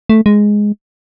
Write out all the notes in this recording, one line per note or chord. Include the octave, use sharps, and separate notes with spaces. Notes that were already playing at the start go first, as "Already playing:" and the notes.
A3
G#3